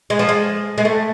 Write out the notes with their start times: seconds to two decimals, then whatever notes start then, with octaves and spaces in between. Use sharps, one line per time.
0.10 G#3
0.19 F3
0.29 G#3
0.78 G#3
0.85 A3